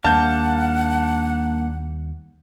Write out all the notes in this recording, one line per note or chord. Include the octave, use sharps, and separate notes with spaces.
D#2 G3 A#3 D4 F5 F#5 A5 G6